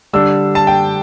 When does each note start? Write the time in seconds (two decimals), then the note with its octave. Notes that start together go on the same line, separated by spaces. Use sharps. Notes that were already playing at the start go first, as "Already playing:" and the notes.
0.13 D3 G3 D4 E6
0.55 A5
0.67 G5